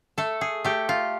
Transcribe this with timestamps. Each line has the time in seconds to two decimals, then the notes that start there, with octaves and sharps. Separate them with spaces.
0.18 A3 A4
0.41 G#4
0.64 A3 G4
0.89 F4